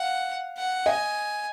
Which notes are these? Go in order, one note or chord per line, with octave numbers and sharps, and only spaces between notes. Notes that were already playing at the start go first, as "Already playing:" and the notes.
Already playing: F5 F#5
F#5
D#5 G#5